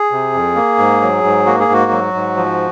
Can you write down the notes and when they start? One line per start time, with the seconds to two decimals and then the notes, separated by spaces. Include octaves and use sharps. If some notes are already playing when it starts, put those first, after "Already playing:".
Already playing: G#4
0.11 C3
0.34 F2
0.56 A#3
0.79 G#2
1.02 F#3
1.24 G#2
1.46 A#3 F#4
1.60 G#4
1.68 G#2 F#4
1.91 F#3
2.14 G#2
2.36 F3